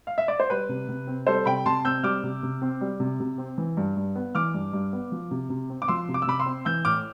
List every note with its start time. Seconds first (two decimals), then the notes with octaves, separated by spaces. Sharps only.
0.07 F5
0.18 E5
0.28 D5
0.40 C5
0.50 G3 B4
0.69 C3
0.88 C3
1.07 C4
1.27 G3 A4 C5
1.46 C3 G5 B5
1.66 C3 A5 C6
1.85 C4 E6 G6
2.03 G3 D6 F6
2.23 C3
2.43 C3
2.62 C4
2.81 G3
3.00 C3
3.20 C3
3.38 C4
3.58 E3
3.77 G2
3.96 G2
4.16 B3
4.35 E3 D6 F6
4.54 G2
4.73 G2
4.93 B3
5.12 F3
5.31 C3
5.50 C3
5.70 C4
5.82 D6
5.88 F3 C6 E6
6.09 C3
6.14 D6
6.22 E6
6.27 C3 B5 D6
6.40 C6 E6
6.46 C4
6.65 E3 E6 G6
6.85 A2 D6 F6